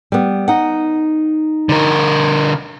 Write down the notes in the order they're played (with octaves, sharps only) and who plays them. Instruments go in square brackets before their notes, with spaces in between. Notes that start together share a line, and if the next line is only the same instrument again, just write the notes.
[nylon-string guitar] G3 B3
D#4 F#5
[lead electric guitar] D3 A#4